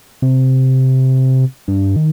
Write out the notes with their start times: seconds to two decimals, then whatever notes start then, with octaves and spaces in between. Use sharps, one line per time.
0.22 C3
1.68 G2
1.96 D#3